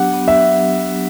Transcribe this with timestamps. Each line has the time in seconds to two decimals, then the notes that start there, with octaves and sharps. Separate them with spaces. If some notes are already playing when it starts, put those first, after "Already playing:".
Already playing: F#3 B3 D4 G4 F#5
0.13 B3
0.28 E5
0.42 F#3